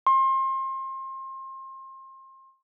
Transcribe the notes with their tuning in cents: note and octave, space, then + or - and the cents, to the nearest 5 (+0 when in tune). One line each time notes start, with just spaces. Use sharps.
C6 +30